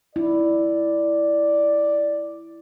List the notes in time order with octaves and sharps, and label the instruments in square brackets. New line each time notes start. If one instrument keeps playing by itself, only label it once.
[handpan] E4 [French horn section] D5